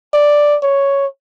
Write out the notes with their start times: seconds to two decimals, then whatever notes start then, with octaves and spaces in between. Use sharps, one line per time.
0.14 D5
0.63 C#5